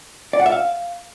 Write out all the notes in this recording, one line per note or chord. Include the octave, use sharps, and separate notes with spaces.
D5
F#5
E5
F5